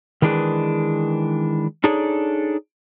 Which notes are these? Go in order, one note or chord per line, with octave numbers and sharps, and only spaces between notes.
D#3 E3 G#3 D4 G#4 B4
D4 D#4 G#4 A4 C#5 D5